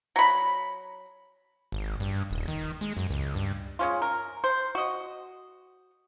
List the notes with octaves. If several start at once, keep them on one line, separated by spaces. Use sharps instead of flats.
F#3 B5
G#1
G2
D#1
D#3
G#3
F#2
C#2
G2
G#3 C#4 F4
A#4
C5
F#4 D#5